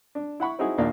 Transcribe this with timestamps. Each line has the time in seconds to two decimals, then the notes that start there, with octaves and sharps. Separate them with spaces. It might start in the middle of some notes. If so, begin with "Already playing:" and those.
0.15 D4
0.40 E4 F#5 B5 C#6
0.59 C4 D#4 E4 F#4 G#4
0.78 A#1 D#2 A#3 D4 D5 F5